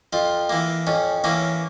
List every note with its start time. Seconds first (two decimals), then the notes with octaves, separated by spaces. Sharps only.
0.13 F2 F4
0.49 E3 A#3
0.87 F2 C#4
1.24 E3 A#3 C#4